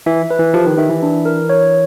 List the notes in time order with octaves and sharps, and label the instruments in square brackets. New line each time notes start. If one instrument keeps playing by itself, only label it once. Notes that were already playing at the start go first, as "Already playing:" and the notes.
[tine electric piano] E3 [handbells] E5
[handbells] B4
[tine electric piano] E3
[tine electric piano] F3 [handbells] G4
[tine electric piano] D#3
[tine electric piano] D#3 [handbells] E5
[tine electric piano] E3
[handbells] D4
A#4
C#5